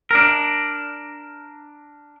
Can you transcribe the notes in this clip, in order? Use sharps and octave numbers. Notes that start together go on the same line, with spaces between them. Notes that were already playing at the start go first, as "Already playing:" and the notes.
D4 A#4